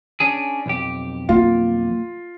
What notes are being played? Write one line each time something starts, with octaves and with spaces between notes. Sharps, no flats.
C#4 D4 G#4
B1 F2 G4
A#3 F4